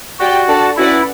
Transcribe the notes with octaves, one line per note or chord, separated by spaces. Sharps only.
F#4 G4 D5 G5
D4 A4 D5 A5
C#4 E4 F#4 B4 D5 F#5